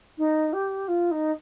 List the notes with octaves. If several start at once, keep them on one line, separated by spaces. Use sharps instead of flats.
D#4
G4
F4
D#4